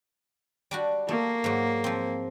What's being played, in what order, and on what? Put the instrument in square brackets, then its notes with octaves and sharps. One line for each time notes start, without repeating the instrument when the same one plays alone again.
[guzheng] G3 D4 F#4
[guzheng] A3 [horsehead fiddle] A#3
[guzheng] G#2 F#3
F3 C4